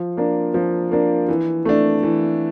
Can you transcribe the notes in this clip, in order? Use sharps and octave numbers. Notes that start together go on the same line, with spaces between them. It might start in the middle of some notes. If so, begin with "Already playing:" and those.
Already playing: F3
A#3 D4
F3
A#3 D4
E3
A3 D4
E3